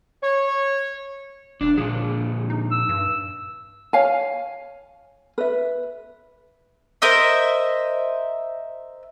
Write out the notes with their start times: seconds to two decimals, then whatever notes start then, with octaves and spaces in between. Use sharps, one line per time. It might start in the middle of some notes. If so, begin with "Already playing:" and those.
0.22 C#5
1.61 E1 D4
1.78 A#2 D3 F3 G#4
2.50 D#4
2.72 E6
2.89 G2
3.93 C#5 F5 G#5
5.38 B4 E5
7.02 A#4 C5 D#5 E5